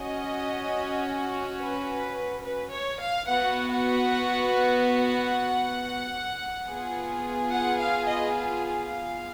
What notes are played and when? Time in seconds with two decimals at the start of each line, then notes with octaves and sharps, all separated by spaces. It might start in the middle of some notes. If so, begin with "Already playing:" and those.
Already playing: C#4 F#4 D#5
1.59 B4
2.44 B4
2.71 C#5
3.00 F5
3.27 B3 F#4 F#5
3.71 F#5
4.97 F#5
6.66 B3 F4 G#4
7.50 F#5
7.78 F5
8.07 D#5
8.35 F5